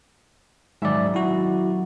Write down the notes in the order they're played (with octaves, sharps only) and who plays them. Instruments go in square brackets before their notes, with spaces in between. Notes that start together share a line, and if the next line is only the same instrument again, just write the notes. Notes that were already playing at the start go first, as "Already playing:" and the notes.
[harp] D#1 F#3 E5 [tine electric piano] G#2 D5
[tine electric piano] E4 F#4